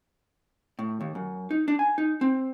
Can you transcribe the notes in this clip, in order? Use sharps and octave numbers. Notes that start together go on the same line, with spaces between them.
A2
D#2
F#2
D#4
D4
G#5
D#4
C4